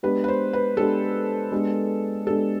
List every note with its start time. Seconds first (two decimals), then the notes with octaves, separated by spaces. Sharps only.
0.03 G#3 B3 D4 G4 B4
0.24 B4
0.28 C5
0.53 B4
0.77 G#3 B3 D4 G4 A4
1.52 G#3 B3 D4 G4
2.27 G#3 B3 D4 G4 A4